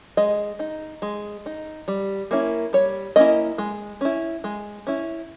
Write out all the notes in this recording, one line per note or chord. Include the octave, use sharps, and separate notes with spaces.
G#3 D#5
D#4
G#3
D#4
G3
A#3 C#4 E4
G3 C#5
A#3 C#4 E4 D#5
G#3
C#4 E4
G#3
C#4 E4